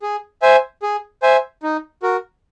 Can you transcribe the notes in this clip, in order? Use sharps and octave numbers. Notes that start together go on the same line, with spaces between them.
G#4
C5 E5 G#5
G#4
C5 E5 G#5
D#4
F#4 A#4